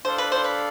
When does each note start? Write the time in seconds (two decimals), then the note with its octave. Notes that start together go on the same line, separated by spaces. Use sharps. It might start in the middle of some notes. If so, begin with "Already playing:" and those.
0.05 D4 A4 C5 D5 F5
0.18 B4
0.32 C5
0.44 B4